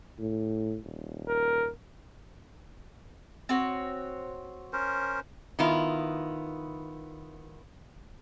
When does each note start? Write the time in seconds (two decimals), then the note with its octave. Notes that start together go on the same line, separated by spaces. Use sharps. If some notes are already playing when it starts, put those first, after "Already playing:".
0.20 A2
0.85 D#1
1.28 A#4
3.49 C4 F#4 C#5
4.73 C#4 A#4 C5
5.59 D#3 B3 E4 F4